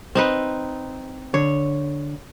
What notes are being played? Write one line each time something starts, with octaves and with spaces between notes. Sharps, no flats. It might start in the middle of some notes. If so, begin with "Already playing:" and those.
C4 D#4 B4
D3 C#5